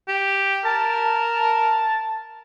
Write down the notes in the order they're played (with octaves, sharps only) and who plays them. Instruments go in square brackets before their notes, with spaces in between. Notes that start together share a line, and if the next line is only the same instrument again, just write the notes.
[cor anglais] G4
[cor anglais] A#4 [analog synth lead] A5